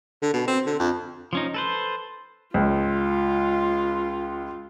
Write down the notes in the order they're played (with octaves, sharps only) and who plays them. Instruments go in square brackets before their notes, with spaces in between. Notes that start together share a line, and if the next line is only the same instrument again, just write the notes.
[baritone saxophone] D3
B2
C4
D3
F2
[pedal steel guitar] F3 C#4 D#4
A4 B4 C5
[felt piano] C#2 [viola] F4